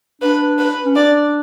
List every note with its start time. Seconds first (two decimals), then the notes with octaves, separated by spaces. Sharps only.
0.22 D4 B4
0.59 B4
0.84 C#4
0.96 D4 D5